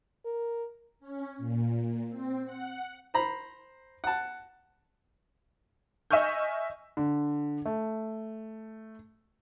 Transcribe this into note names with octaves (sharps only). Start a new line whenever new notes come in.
A#4
C#4
A#2
C4
F#5
C5 A#5 B5
F#5 A5
D#5 E5 G#5 C#6 F6 G6
D3
A3